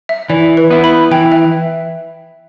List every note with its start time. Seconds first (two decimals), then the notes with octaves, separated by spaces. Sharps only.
0.09 E5
0.29 E3 D5
0.57 B4
0.70 B3 E4
0.84 B5
1.11 E3 G5
1.32 E5